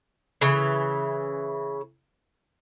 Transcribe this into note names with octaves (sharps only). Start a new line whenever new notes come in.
C#3 E3